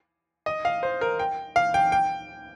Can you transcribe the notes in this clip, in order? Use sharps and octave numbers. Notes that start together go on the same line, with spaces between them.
D#5
F5
C5
A#4
G5
F5
G5
G5